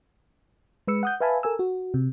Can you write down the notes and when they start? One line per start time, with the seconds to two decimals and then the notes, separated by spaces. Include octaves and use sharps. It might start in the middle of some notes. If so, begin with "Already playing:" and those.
0.87 G#3 B4 E6 C#7
1.03 F#5 D#6 G6
1.21 B4 E5 F5 G#5 A5 B5
1.43 A4 A#4 G#5 E6
1.59 F#4
1.94 C3